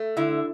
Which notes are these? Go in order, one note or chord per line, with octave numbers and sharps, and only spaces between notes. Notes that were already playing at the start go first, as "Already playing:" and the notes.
Already playing: A3
D3 E4